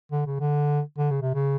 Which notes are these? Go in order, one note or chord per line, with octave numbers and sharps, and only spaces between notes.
D3
C#3
D3
D3
C#3
C3
C#3